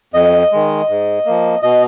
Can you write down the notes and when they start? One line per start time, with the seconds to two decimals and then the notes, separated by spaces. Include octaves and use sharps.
0.14 F2 D#5
0.52 D#3 G#3
0.89 G#2
1.26 F3 A#3
1.62 B2 D#5